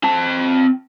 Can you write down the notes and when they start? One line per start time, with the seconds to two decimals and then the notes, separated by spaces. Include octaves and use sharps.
0.04 C4 A5